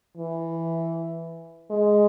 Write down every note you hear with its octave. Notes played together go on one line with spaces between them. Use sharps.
E3
G#3